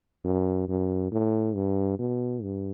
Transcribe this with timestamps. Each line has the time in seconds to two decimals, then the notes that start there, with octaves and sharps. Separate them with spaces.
0.25 F#2
0.69 F#2
1.12 A2
1.55 G2
1.99 B2
2.43 G2